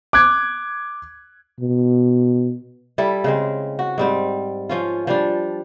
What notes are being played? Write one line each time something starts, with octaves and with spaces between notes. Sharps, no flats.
D6 F#6 G#6
B2
G3 E4 A4
C#3 G#3 C4
F#4
G#2 G3 C4
F3 C#4 F4
F3 G3 D4